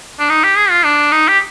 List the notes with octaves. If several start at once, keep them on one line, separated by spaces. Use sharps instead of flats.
D4
D#4
G4
G#4
F4
D4
D#4
G4